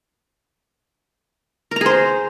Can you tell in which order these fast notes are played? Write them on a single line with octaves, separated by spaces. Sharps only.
A#4 A#5 G#4 C5